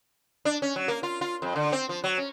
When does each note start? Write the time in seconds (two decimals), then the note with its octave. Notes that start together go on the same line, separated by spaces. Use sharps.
0.45 D4
0.62 C#4
0.76 F#3
0.88 A#3
1.03 F4
1.21 F4
1.42 F2
1.56 D3
1.72 C4
1.89 F3
2.04 F#3
2.17 C#4